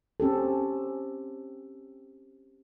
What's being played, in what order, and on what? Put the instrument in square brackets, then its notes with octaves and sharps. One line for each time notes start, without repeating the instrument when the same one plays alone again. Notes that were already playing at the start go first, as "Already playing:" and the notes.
[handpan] C4 C#4 G4 A4